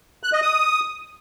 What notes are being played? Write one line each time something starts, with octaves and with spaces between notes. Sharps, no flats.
F#6
D#5
D#6